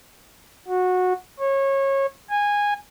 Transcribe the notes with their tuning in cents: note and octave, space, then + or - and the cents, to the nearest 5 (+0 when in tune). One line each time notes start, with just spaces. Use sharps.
F#4 -15
C#5 -25
G#5 -15